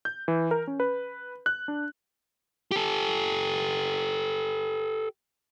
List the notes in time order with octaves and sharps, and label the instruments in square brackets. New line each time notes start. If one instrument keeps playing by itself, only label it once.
[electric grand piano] G6
E3
A#4
C#4
B4
F#6
D4
[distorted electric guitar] G4 A4